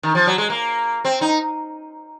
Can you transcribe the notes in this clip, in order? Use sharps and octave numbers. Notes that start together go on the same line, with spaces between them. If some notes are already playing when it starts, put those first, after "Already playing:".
D#3
F3
F#3
G#3
A#3
C4
D#4